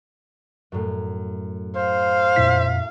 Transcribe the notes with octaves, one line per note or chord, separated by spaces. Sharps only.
F#2 A2
C5 F5
F2 A#2 E4 B6